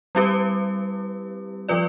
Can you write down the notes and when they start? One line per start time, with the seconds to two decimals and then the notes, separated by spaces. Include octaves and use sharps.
0.15 G3 C4 E4 G4 B4
1.69 F3 C4 F4 B4 D5